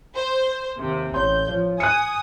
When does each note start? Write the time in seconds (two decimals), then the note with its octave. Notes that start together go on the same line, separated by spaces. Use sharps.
0.16 C5
0.79 D#2 C3
1.14 A1 C#5 C6 G6
1.48 F3 C#5
1.80 G#5 D#6 F#6 C#7